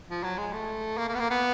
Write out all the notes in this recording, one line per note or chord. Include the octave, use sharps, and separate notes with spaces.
F3
F#3
G#3
A3
A#3
A#3
B3
A#3
B3